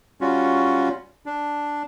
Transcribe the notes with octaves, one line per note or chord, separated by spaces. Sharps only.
G3 C#4 F4 F#4
D4